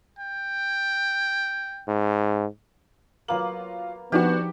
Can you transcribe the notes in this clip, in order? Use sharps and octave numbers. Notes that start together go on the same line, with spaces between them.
G5
G#2
F#3 A#3 B3 F4 F#7
F3 B3 C4 D4 D#4 F#4 G4 G5